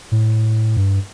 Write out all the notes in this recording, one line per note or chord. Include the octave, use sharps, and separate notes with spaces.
A2
G2